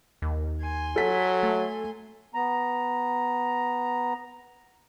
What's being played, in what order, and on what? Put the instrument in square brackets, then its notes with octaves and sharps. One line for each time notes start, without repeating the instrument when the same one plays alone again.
[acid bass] D#2
[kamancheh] G#5 C6
[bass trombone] F#3 [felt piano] A4 B6
[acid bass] A3
[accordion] B3 A#5